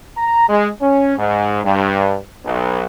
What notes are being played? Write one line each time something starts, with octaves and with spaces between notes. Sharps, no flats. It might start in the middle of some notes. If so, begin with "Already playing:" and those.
A#5
G#3
C#4
G#2
G2
B1